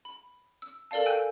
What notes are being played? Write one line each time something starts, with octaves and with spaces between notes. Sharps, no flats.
B5
E6
A4 A#4 D5 F5 A5
G5 G#5 E6 F#6 G6